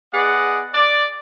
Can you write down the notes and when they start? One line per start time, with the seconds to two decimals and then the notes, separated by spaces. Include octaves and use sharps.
0.14 B3 G#4 D5 D#5 F#5
0.74 D5